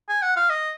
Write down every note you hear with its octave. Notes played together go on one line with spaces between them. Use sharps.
G#5
F#5
F5
D#5